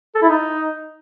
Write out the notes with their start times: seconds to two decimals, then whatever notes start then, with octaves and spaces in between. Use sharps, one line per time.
0.15 A4
0.22 E4
0.29 D#4